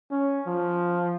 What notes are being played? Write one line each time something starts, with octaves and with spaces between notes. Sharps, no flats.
C#4
F3